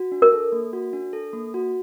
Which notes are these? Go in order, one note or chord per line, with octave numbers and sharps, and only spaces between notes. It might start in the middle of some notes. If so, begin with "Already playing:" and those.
Already playing: F#4
D4
A#4
A4
A#3
F#4
D4
A4
A#3
F#4